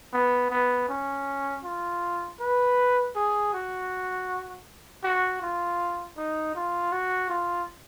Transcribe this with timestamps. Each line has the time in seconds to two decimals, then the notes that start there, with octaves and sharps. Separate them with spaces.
0.13 B3
0.50 B3
0.89 C#4
1.64 F4
2.39 B4
3.15 G#4
3.53 F#4
5.04 F#4
5.42 F4
6.17 D#4
6.55 F4
6.92 F#4
7.30 F4